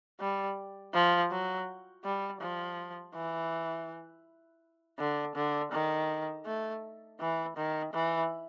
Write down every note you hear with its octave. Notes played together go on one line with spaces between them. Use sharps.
G3
F3
F#3
G3
F3
E3
D3
D3
D#3
A3
E3
D#3
E3